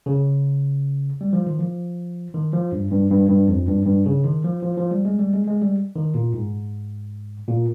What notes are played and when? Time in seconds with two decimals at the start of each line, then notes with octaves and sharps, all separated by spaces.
0.06 C#3
1.21 G3
1.33 F3
1.46 D#3
1.59 F3
2.34 D#3
2.53 F3
2.72 G2
2.91 G2
3.10 G2
3.29 G2
3.48 F2
3.67 G2
3.86 G2
4.06 C#3
4.24 D#3
4.44 F3
4.63 F3
4.77 F3
4.91 G3
5.05 G#3
5.19 G3
5.34 G#3
5.47 G#3
5.62 G3
5.96 D#3
6.14 A#2
6.34 G#2
7.48 A#2